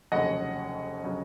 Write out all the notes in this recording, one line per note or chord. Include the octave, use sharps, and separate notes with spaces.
F1 D#2 C#3 F#3 D#5 F#5
C#3 F#3